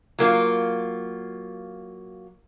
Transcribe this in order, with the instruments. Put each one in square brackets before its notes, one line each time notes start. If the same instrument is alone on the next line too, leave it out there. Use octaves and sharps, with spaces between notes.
[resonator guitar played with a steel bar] F#3 A#3 F4